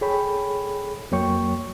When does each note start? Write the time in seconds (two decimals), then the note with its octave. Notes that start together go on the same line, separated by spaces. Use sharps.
0.01 G#4 A4 C#5 G5 B5
1.11 F2 F#3 A#3 C#5 G5 C#6